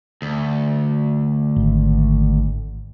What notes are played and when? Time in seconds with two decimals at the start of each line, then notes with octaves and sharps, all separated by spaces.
0.22 D2
1.56 G#1